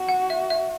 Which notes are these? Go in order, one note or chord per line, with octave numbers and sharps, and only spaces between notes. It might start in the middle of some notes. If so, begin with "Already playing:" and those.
Already playing: F#4
F#5
E5
E5